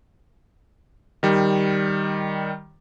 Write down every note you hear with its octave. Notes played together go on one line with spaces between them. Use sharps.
D#3 G3